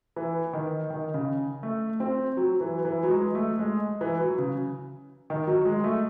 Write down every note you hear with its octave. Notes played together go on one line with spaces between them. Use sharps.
E3
D#3
D#3
C#3
A3
C4
F#3
E3
E3
F#3
G#3
A3
G#3
E3
F#3
C#3
D#3
F#3
G#3
A3